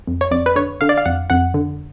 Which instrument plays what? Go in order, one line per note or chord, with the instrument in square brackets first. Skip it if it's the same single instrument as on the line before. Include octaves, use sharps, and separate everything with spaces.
[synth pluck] F2
C#5
F2 D5
B4
D3 C#5
D3 F5
D5
F5
F2 F#5
F2 F#5
D3